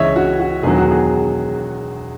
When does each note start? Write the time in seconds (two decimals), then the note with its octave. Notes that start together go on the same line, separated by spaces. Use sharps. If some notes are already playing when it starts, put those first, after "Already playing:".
Already playing: C#2 C#3 E3 C#5 D#5 E5
0.16 F#4
0.40 F#4
0.63 E1 E2 D#3 F#3 G#4
0.77 F#4
0.91 G#4